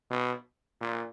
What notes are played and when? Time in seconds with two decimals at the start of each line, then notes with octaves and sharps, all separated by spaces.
0.10 B2
0.81 A#2